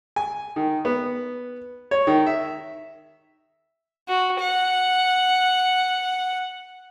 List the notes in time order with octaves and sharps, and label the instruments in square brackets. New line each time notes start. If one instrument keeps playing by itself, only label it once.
[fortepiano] G#5
D#3
B3
C#5
D#3
E5
[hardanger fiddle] F#4
F#5